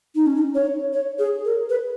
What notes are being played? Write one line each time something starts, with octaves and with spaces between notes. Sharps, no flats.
D#4
C#4
D#4
C#5
C#5
G#4
A#4
B4